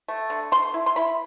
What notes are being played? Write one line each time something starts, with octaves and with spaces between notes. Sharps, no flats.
A3
D3
D3 C6
E4
C6
E4 B5